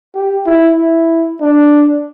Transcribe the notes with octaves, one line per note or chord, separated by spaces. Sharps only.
G4
E4
E4
D4